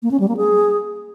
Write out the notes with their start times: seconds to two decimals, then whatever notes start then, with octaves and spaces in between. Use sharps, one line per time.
0.03 A#3
0.11 C#4
0.20 G3
0.28 A#3
0.37 G#4